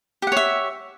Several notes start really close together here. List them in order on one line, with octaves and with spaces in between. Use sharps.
G4 F#5 C#5 E5